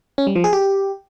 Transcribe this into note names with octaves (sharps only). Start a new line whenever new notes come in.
C#4
G3
F3
G#4
G4